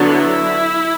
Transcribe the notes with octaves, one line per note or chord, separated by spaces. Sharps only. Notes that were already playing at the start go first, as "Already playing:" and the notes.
Already playing: D3 F#3 B3 D4
E4